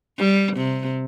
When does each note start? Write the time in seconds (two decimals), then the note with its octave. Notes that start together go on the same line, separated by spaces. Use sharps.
0.18 G3
0.57 C3